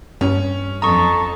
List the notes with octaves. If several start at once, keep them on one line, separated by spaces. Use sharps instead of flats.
G2 C#4
F2 A4 A#5 C#6 D#6